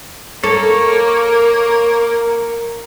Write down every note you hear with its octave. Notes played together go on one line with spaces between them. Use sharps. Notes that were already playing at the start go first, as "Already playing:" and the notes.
A#3 A4 A#4 C#5